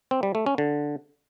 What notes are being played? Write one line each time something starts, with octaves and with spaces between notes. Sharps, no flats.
C4
G3
A3
C#4
D3